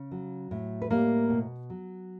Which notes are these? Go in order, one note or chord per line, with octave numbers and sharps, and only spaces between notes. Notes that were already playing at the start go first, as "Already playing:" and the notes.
Already playing: C#3
F#3
A2
B4
G3 A#3 A#4
B2
F#3